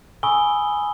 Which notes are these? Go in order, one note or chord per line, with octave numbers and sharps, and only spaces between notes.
G#5 B5 C#6 D#6 E6 G7